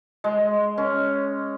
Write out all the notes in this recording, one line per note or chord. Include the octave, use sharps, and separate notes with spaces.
G#3
C#4